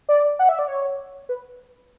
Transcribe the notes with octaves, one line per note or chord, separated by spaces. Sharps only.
D5
F#5
E5
D5
C#5
B4